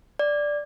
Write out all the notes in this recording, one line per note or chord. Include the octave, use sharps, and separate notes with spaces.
D5